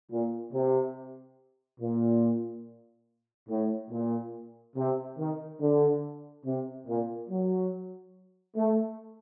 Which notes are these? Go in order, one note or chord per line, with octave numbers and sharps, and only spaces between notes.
A#2
C3
A#2
A2
A#2
C3
D#3
D3
C3
A#2
F#3
A3